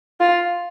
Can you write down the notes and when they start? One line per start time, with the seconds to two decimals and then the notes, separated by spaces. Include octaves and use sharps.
0.20 F4